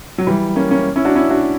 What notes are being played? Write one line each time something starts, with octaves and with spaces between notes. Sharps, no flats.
F#3
E3 G3
A#3 C#4
A#3 C#4
C#4 E4
D4 F#4
C#4 E4
D4 F#4